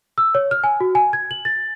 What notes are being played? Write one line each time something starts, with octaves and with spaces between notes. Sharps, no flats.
E6
C#5
F6
G#5
F#4
G#5
G#6
F#7
A6